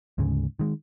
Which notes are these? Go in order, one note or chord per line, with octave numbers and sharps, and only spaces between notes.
D2 G#2 C#3 G#3
D#3 G#3